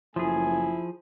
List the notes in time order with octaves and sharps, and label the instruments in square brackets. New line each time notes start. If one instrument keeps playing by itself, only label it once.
[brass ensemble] F#1 A3 G#5 [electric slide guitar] F3 G#4 [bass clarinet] E4